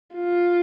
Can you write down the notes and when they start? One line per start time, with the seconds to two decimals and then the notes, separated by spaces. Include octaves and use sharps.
0.15 F4